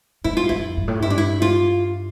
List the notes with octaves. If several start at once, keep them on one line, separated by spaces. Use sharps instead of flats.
A2 E4
F4
F2 E4
G2
A2
G2 E4
D4
E4
F4